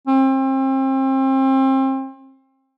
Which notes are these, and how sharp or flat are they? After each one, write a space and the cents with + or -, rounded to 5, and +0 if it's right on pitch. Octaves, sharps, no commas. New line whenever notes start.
C4 +35